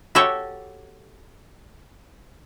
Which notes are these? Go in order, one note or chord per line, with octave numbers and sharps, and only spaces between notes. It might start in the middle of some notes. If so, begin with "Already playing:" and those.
F#4 G4 A4 C#5 E5